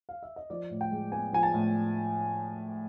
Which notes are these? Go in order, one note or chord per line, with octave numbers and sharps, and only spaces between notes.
F5
E5
D#5
F3 D5
A2
G5
G#3
B3 G#5
F3 G#5
A5
A2